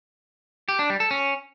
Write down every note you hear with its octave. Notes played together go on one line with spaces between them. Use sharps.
G4
D4
G3
A4
C#4